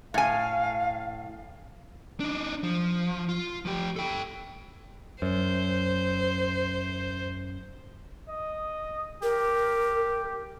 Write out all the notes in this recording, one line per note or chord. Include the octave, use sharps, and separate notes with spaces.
A2 F5 G#5
D4 D#4
F3
F4
F3 G4
A4 G5
F#2 C5
D#5
G4 A#4